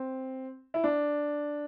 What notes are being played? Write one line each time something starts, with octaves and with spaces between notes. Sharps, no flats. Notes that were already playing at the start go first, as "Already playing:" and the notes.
Already playing: C4
E4
D4